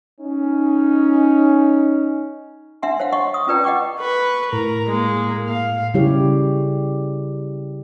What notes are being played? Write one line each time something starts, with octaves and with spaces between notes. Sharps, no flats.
C#4 D#4
D4 E5 F#5 C6
C5 C#5 F5 F#5
D#5 F#5 C6 C#6
D#6
C#4 F4 B4 D5 G5 A#5
D#5 F#5 G5 C#6 D6
B4 C#6
A2 A#4 A#5
G#3 A#3
F5
C#3 G3 E4 G4 C#5